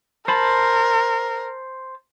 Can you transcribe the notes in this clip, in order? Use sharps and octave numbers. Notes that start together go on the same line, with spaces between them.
A#4 C5 A5 B5